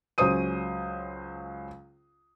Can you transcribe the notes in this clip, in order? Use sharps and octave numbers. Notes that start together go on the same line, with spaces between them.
C#2 F#3 C#4 C5 D#6 D#7